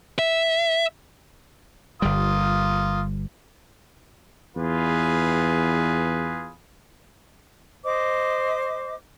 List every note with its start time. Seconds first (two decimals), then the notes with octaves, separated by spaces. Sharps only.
0.19 E5
2.02 G1 G3 A#3 F4 D#6
4.57 E2 F4 G#4 B4
7.83 C5 D#5 D6